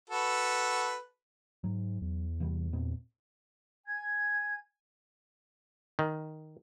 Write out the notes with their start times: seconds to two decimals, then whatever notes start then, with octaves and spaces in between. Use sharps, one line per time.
0.10 F#4 A4 B4
1.64 G#2 F#3
2.02 E2
2.40 C3 E3 G3
2.73 A#2 B3 C4
3.86 G#5 G#6
5.99 D#3